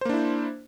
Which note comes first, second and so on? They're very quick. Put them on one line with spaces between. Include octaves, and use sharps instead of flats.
C5 A#3 D4 E4